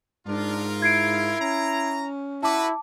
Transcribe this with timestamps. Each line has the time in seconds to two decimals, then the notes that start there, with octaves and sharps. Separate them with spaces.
0.27 G#2 D4 F4 A#4
0.82 E4 G#6 C7 D7
1.40 C#4 A#5
2.43 E4 F#4 B4 A5 D6